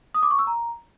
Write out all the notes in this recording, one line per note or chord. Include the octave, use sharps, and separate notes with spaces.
D#6
D6
C#6
E6
A#5